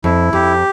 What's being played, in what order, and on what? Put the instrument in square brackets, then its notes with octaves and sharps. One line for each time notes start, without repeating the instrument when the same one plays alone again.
[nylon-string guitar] F2 [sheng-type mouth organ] E4
[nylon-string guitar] F2 [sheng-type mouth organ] G4